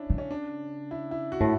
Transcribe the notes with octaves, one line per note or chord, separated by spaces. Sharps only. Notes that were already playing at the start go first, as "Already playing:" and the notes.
Already playing: C#4 D4 E4
C#3
C#4
D4
E4
E4
F#4
A2